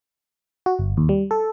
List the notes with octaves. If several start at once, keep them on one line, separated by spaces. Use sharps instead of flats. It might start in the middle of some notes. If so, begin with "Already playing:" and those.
F#4
G1
D#2
G3
A4